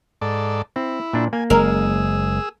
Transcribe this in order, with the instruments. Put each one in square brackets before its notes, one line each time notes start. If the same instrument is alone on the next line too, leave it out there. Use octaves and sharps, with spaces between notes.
[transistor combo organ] G#2 A4 D5
[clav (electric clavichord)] C4 [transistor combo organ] E4
[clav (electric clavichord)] A#2 D4
[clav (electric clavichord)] A#3 [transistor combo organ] G#5
[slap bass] F#1 G#3 [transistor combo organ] G#4 E6 [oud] A#4